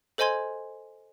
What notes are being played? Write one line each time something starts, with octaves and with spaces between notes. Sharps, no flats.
A4 C5 D#5 G#5 C6 G#6